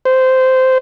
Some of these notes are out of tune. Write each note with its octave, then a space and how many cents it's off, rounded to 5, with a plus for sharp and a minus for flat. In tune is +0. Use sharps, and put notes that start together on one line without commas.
C5 -15